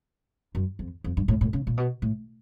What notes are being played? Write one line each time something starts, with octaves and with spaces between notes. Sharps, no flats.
F#2
F2
F2
G2
A2
A2
C#3
A#2
B2
A2